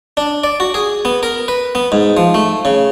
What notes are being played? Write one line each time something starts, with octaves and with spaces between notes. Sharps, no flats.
D4
D5
F#4
G#4
B3
A#4
B4
B3
G#2
F3
A3
C#3